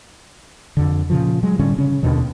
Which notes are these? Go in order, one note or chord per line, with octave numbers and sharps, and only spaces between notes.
F2 D3
A#2 C#3 F3
F#3 G#3
A2 D3 G3 C#4
C#3 C#4
D#2 B2 D3 D#3